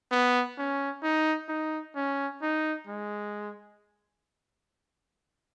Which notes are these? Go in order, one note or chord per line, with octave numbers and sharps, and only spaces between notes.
B3
C#4
D#4
D#4
C#4
D#4
G#3